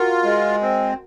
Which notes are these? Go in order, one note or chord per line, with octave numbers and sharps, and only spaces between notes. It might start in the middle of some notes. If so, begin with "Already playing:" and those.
Already playing: F4 F#4 A#4
G#3
C4